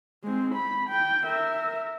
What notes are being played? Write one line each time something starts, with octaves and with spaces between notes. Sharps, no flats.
G#3 C4
B5
G5
A#4 E5